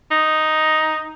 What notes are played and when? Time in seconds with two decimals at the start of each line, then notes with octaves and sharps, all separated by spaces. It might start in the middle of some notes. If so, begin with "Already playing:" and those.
0.11 D#4